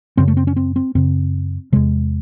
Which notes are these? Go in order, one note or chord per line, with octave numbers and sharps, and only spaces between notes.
F#2 C#3 C4
A3
C4
C#4
C4
C4
F#2 C#3 C4
E2 C3 G#3